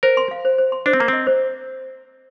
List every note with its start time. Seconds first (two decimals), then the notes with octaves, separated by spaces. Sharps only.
0.03 A#4 C5
0.17 C6
0.31 F5
0.45 C5
0.58 C5
0.72 C6
0.86 D4 C5
0.93 C4
1.00 A#3 A#5
1.08 C4 D#5
1.27 C5